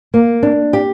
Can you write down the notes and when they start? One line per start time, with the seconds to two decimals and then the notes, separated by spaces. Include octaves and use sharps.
0.14 A#3
0.43 D4
0.73 G4